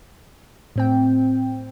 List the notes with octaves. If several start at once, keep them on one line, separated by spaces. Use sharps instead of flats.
A2 C4 G5